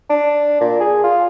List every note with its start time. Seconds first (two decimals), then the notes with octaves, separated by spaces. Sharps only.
0.10 D4
0.61 A#2
0.80 G#4
1.04 F4